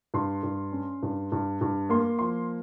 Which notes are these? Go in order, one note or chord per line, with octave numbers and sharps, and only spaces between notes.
G2 C6
G2
C#4
G2
G2
G2
A#3 C6
F3 C6